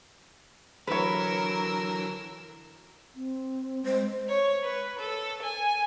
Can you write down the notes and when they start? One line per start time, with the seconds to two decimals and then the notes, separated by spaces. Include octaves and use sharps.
0.87 D3 E3 F#3 A#4 B4 C#5 E6
3.16 C4
3.85 G#3 C5
4.28 C#5
4.63 B4
4.99 A4
5.42 G#5